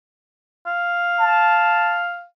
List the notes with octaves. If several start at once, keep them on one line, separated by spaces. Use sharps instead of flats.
F5
A5